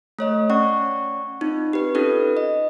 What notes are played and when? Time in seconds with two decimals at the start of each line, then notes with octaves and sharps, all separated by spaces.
0.19 A3 C#5 D#5
0.50 C#4 D5 F#5 C#6
1.41 C4 D#4 F4
1.73 G4 B4
1.95 C#4 D#4 F4 A4 B4
2.37 D#5